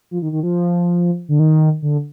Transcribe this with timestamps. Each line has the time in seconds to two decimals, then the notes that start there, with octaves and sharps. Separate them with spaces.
0.11 F3
0.22 D#3
0.32 D#3
0.43 F3
1.29 D3
1.39 D#3
1.82 D3